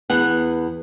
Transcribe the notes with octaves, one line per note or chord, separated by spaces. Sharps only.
E2 B3 F#5